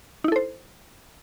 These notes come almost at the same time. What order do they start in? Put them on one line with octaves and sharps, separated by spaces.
D#4 E4 A4 C5